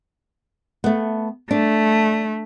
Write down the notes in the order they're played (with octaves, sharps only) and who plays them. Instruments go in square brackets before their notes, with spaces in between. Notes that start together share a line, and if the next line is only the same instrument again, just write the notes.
[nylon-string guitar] A3 B3
[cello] A3 [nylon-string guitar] D4